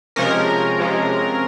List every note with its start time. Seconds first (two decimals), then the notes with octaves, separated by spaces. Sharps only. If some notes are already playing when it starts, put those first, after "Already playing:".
0.16 C3 F3 G#3 C#4 A#4
0.79 C3 F3 G#3 C#4